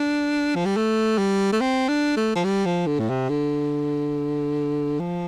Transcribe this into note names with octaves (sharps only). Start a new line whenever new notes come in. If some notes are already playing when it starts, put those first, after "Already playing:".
Already playing: D4
F3
G3
A3
G3
A3
C4
D4
A3
F3
G3
F3
D3
A2
C3
D3
F3